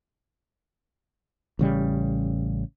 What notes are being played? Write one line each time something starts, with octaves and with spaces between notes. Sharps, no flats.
A1 C#3 G3